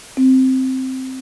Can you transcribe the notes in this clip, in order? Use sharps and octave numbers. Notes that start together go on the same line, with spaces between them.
C4